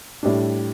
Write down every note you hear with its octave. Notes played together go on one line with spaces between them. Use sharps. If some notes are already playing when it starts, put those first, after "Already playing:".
A2 G3 D4